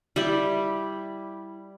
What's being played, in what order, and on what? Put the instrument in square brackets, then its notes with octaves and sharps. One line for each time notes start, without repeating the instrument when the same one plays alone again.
[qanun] G3 E4 G4